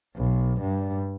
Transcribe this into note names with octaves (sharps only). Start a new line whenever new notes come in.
B1
G2